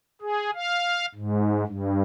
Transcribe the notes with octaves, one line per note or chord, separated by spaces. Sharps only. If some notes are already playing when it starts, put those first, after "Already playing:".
G#4
F5
G#2
G2